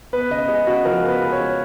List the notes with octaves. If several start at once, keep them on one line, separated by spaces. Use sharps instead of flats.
B3 B4
C#3 D#5
G#3 D#5
C#3 F#4
F3 A#4
B3
B4
G#3
C#5
G#3